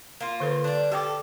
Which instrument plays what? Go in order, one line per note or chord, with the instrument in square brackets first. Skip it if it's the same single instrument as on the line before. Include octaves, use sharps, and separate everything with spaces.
[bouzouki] A#3 F4
[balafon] D3 A4 B4
[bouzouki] G3 D4
[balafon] G4 G5 D6 [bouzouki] A4